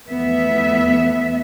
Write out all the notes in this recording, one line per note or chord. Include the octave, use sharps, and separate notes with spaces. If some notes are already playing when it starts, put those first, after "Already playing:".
E2 F3 A3 B3 E5